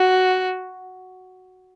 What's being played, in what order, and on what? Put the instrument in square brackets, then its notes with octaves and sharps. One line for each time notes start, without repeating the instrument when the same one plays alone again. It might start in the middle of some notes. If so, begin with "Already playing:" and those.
Already playing: [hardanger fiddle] F#4